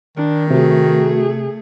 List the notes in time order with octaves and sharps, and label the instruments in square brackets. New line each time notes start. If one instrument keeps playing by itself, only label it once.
[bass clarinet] D#3 [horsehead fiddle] D4
[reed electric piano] C3 [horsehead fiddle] A3 G#4 [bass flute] F#4